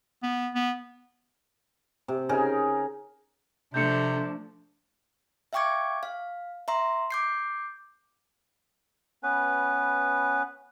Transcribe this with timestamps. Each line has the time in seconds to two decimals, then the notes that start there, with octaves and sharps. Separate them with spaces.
0.23 B3
0.55 B3
2.08 C3
2.29 C#3 D#4 G#4 A#4
3.74 C3 F3 A3 D4 G6 C#7
5.53 E5 F5 G5 C#6 D6 G#6
6.03 F5
6.68 E5 A#5 C6
7.11 D6 G6 C7
9.23 B3 C#4 B4